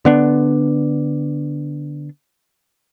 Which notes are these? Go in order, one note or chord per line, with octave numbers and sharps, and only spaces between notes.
D3 B3 D4